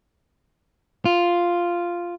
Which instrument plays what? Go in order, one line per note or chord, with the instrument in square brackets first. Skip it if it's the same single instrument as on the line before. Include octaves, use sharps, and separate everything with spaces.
[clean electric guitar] F4